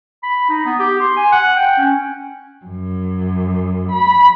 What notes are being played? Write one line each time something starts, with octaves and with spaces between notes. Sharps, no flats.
B5
D#4
B3
G4
C6
G#5
F#5
G5
C#4
F#2
B5